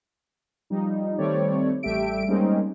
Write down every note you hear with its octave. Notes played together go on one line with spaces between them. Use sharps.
F3 G3 D#4
D#3 G3 A3 C4 C#5 D5
A1 G3 A3 G4 E5 D7
G3 G#3 A#3 C4 C#4 D#4